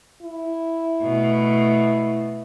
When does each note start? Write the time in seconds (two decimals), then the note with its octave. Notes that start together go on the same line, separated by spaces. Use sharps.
0.22 E4
1.03 B2 A3